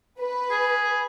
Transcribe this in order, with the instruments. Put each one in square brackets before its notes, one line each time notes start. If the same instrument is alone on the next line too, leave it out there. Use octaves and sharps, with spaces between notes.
[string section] B4
[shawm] G#4